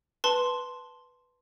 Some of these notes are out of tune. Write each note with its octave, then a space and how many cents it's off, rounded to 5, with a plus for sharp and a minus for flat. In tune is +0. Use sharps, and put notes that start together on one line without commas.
B4 +0 A5 +5 C6 +0